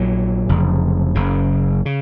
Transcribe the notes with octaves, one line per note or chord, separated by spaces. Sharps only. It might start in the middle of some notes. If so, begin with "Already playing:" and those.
Already playing: A#1 A#2 F#3
F1 F2 C#3
F#1 F#2 C#3
C#3